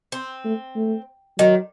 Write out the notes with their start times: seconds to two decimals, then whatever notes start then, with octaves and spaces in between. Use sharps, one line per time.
0.12 C4
0.45 A3
0.76 A3
1.39 D#3 F#3